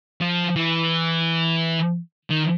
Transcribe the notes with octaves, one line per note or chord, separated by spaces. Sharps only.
F3
E3
D#3